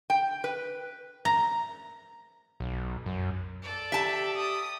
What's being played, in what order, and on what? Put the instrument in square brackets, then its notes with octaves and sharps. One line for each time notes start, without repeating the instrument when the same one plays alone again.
[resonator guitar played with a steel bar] G5
B4
[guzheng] A#5
[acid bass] B1
F#2
[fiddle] A4 D5
[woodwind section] G4 [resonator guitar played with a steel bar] E5 A5
[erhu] D#6